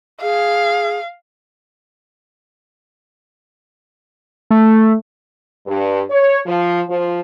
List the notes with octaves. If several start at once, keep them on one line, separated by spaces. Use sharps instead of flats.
G#4 F5
A3
G2
C#5
F3
F3